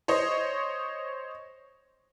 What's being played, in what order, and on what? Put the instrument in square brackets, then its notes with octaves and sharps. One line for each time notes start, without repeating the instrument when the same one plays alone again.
[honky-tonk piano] C5 C#5 D#5